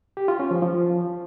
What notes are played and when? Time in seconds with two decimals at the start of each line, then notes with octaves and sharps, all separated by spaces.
0.17 G4
0.28 F4
0.40 C#4
0.51 F3
0.62 F3